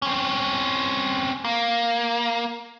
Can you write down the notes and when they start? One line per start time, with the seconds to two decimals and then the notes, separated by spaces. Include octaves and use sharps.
0.02 C4 C#4
1.45 A#3